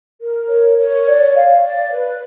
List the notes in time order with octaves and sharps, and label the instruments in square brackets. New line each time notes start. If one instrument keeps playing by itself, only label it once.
[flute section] A#4
C#5
C#5
D5
F5
D5
B4